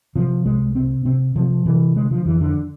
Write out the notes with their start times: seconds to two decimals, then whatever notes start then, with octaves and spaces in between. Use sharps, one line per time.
0.15 C3 F3
0.45 C2 G#3
0.75 C3 C4
1.05 C3 C4
1.35 C3 F3
1.66 C3 E3
1.95 D3 G#3
2.11 F3
2.26 F2 E3
2.41 D3